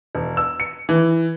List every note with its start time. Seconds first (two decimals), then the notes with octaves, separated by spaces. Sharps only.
0.15 E1
0.37 E6
0.60 C#7
0.89 E3